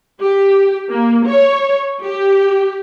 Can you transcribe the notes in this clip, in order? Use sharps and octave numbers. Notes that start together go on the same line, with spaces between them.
G4
A#3
C#5
G4